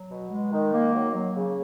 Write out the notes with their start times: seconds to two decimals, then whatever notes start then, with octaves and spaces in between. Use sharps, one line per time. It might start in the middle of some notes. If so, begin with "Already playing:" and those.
Already playing: F#3
0.10 B2
0.31 G#3
0.51 D#3
0.73 A#3
0.94 F#3
1.13 F#3
1.35 C#3